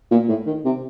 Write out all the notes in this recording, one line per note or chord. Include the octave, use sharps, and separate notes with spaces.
A#2
A2
D#3
C3